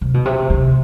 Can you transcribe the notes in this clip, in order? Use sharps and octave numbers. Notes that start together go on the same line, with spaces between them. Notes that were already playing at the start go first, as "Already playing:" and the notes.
C3
B2
C3
C3